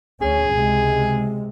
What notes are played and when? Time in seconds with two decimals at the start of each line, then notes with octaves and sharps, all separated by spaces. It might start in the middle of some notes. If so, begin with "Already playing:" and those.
0.22 D2 C#4 G#4
0.52 C#2 C3 G#3